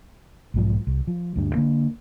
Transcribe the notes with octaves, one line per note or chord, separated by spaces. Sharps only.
B1 G#2 F3
C2
F3
D2 G2
D3 A#3